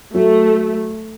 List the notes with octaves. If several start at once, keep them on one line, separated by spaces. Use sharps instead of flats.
F#3 A3